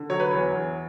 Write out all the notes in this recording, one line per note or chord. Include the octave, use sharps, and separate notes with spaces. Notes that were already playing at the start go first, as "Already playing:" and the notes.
Already playing: D3
F#3 C#5
B4
E2 C#5
E2